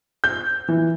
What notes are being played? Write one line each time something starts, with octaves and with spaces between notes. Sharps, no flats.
G6
E3